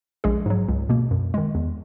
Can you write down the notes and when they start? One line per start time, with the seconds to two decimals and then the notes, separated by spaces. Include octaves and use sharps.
0.24 A#1 G#3 G#4
0.46 G#2 F#3
0.68 C#2
0.89 B2 A#3
1.11 F#2
1.34 D#3 G#3
1.55 E2